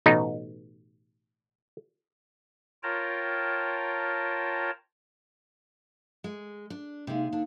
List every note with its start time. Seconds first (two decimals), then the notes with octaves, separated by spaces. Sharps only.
0.06 A1 B2 D#4
2.83 F4 A#4 C#5 G5 A5 A#5
6.24 G#3
6.70 D4
7.07 C3 G#3 A#3 D#4 F5
7.32 D3 D4